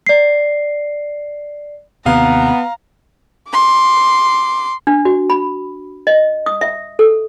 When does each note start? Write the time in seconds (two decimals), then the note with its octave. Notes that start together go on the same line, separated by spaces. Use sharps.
0.07 D5 C7
2.06 D#2 C3 B3 F5 A#5
3.49 C6 D6
4.87 D4
5.05 F#4
5.30 B5
6.07 D#5
6.46 D#6
6.61 E5
6.99 A4